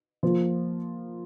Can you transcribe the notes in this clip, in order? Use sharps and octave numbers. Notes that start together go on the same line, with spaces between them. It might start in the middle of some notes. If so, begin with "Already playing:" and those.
F3 A#3 F4 C5